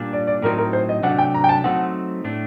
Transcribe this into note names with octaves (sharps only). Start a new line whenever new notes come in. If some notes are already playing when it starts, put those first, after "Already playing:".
Already playing: A#2 G3 D4
D5
D5
A2 F#3 C4 D#4 A#4
A#4
C5
D#5
C3 F#3 A3 D4 F#5
G5
A#5
G5
A5
F#3 A3 C4 D#4 F#5
A2 A3 D4